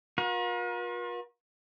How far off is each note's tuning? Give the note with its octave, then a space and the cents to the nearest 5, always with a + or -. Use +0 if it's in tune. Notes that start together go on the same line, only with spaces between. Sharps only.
F4 +45 A#4 +45